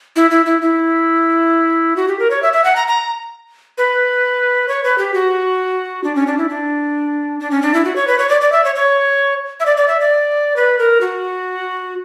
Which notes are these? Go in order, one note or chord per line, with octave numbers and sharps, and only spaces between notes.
E4
E4
E4
E4
F#4
G4
A#4
C#5
E5
E5
F#5
A#5
A#5
B4
C#5
B4
G4
F#4
D4
C#4
D4
E4
D4
D4
C#4
D4
E4
F#4
C#5
B4
C#5
D5
D5
E5
C#5
C#5
E5
D5
D5
E5
D5
B4
A#4
F#4